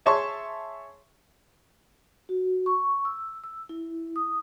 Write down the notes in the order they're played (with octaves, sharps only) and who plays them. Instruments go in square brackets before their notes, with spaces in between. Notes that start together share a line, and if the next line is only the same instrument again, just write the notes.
[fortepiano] G#4 C#5 E5 A5 C6 C#6
[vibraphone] F#4
C#6
E6
E6
E4
D#6